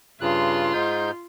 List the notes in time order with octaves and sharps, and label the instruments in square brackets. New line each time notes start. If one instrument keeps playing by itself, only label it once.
[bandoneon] G2 C#3 F#6 [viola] F4 C6
[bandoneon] G#2 D#4 G6